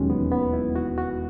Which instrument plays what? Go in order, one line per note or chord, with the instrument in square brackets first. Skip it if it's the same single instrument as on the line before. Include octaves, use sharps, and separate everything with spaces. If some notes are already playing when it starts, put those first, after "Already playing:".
Already playing: [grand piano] E1 D#2 D#3 F#3 C#4 [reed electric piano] G#3
[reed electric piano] B3
B3
E4
F#4
F#4